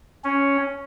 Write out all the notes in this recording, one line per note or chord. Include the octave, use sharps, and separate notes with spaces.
C#4